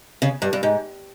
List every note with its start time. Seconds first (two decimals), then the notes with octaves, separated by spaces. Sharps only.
0.22 C#3
0.42 G2
0.53 G2
0.63 G#2